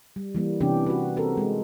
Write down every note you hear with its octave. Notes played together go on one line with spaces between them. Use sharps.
G3
E3 G3 A#3
C3 E3 B3 C#4 D4 G4
F#4 B4
C4 F#4 A4 A#4
G#3